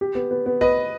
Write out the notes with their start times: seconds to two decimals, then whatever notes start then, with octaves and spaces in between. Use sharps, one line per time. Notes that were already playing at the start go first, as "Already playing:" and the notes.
0.01 G4
0.15 B3
0.31 B3
0.46 B3
0.61 B3 B4 D#5